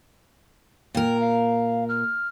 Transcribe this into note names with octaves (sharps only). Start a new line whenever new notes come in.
A#2 A#4 G5
F5
F6